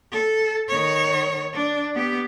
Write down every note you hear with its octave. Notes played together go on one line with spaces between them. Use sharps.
A4
D#3 C#5
D4
B3 G4